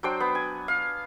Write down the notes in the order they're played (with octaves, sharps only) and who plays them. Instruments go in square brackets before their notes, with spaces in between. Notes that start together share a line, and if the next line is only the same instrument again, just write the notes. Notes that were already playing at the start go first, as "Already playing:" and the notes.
[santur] F#3 D4 C5 G5
B3
G#5
F5